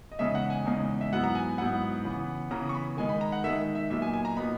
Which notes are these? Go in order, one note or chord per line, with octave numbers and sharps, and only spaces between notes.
D#5
E2 C#3 G#3 D#4 E5
F#5
G#5
E2 C#3 G#3 D#4
E5
G#2 F#3 B3 E4 F#5
A#5
G#5
G#2 F#3 B3 E4 F#5
C#3 E3 B3
C#3 E3 B3 A#5
C#6
B5
D#3 G#3 D#4 G#5
B5
A#5
F#5
D#3 G#3 D#4 E5
E5
A#2 F#3 B3 D#4 E5
G#5
G#5
A#5
A#2 F#3 B3 D#4 B5